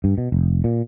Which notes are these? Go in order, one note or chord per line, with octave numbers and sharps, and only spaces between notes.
G2
B2
F1
A#2